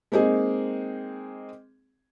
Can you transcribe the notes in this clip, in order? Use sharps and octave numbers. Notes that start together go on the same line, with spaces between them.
G#3 A#3 C4 D#4 G#4